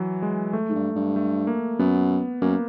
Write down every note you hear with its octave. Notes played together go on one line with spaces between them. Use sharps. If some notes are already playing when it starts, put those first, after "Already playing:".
Already playing: E3 F#3
G#3
A3
G#2
G2
G2
A3
A#3
F#2 B3
F#2 A#3